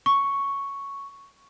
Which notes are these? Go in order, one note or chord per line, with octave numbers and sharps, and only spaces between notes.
C#6